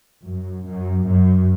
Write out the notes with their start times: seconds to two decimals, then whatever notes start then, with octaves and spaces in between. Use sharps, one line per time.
0.24 F#2
0.65 F#2
1.05 F#2